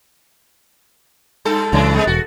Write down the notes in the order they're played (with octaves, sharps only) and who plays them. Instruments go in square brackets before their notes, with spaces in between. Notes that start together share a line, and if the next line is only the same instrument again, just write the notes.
[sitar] G2 A4
[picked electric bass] C#2 [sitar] E3 F#3 D4
[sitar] C3 G#3 B3
[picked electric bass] E1 [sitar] F#4